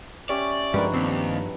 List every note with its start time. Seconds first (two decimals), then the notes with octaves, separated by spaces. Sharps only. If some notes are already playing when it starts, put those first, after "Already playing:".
0.29 C#4 G4 D5 E5
0.74 G2 F3 G3 G#3 B3 D4 D#4 A#4
0.94 D#2 C4 A5